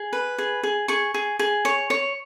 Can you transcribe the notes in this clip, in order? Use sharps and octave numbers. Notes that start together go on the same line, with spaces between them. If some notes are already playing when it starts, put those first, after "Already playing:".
Already playing: G#4
B4
G#4
G#4
G#4 C#6
G#4
G#4
C#5
C#5